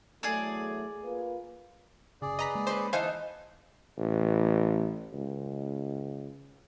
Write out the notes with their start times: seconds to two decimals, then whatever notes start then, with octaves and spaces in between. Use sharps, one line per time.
0.23 E2 F#3 A3 G#4 D5
1.03 A#3 F4 B4
2.22 F#1 C#3 G#4 D5
2.39 B4 D#5 A#5 B6
2.55 G#3 A#3
2.67 C#4 D#4 B4 C5
2.93 E3 D#4 C5 F5 G#5 A5
3.98 A1
5.13 C#2